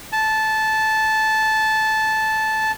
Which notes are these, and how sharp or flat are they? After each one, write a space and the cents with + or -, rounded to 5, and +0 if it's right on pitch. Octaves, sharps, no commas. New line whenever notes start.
A5 -10